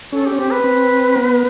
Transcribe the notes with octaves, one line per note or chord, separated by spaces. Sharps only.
C#4 A4
G4
C#4
C4 G4
B4
C4
B3